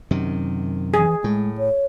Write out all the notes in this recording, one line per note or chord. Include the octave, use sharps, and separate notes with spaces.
F#2 C3 D#3
E3 G#4
A2 G#3
C#5